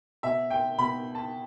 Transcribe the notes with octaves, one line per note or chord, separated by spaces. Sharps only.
B2 E5
G5
B2 B5
A5